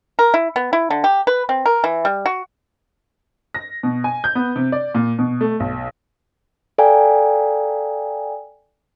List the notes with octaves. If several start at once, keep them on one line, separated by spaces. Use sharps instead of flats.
A#4
E4
B3
E4
D3
G4
B4
C4
A#4
E3
G3
F#4
A#6
B2
G#5
G6
B3
C3
D5
A#2
B2
A3
B1
A4 D5 F5 G5 G#5 A#5